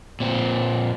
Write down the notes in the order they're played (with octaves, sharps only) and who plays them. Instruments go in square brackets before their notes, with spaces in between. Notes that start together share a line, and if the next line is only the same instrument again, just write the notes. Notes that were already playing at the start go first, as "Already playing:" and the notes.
[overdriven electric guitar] A#2 C4